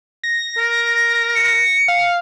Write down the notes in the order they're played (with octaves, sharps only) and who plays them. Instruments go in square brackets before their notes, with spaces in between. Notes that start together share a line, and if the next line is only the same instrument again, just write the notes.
[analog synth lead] A#6
[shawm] A#4
[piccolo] C#7
[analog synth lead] F5